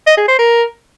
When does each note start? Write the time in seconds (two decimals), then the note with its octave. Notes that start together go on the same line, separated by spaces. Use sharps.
0.07 D#5
0.18 G#4
0.28 C5
0.39 A#4